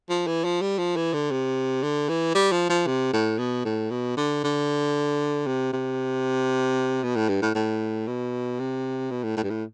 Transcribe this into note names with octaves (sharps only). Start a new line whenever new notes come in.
F3
E3
F3
G3
F3
E3
D3
C3
D3
E3
G3
F3
F3
C3
A2
B2
A2
B2
D3
D3
C3
C3
B2
A2
G2
A2
A2
B2
C3
B2
A2
A2
G2
A2